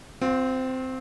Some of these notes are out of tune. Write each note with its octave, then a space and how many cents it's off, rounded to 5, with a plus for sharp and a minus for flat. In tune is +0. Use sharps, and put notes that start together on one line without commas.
C4 -15 F4 +30